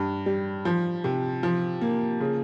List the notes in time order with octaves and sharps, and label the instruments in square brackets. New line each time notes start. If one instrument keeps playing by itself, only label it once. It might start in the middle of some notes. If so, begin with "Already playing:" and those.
Already playing: [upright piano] G2
G3
F3
C3
F3
A#3
C#3